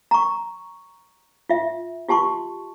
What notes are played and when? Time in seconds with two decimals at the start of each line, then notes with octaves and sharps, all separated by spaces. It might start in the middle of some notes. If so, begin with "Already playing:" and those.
0.11 A#5 C#6
1.49 F4 E5
2.08 F4 G4 A5 C6 C#6